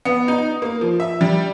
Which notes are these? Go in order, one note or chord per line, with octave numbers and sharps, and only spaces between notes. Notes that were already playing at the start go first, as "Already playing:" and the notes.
B3
D#4
A#3
F3
E5
G3